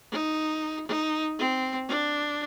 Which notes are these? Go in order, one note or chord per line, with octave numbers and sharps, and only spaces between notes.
D#4
D#4
C4
D4